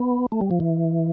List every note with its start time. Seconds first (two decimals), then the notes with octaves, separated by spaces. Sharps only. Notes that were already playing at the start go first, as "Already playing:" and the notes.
Already playing: B3
0.32 A3
0.41 G3
0.51 F3
0.60 E3